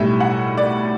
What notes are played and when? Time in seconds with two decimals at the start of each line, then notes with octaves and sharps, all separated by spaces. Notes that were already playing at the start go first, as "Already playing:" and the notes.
Already playing: B1 A2 G3 E5
0.20 F#5
0.58 D5